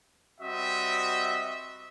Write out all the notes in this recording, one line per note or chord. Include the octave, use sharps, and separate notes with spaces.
G3 C4 F#4 D#5 E5